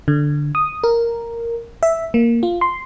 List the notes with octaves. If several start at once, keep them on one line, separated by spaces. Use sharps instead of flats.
D3
D#6
A#4
E5
A#3
F4
C6